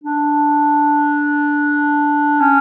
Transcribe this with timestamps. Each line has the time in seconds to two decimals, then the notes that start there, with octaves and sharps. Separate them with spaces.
0.04 D4
2.41 C#4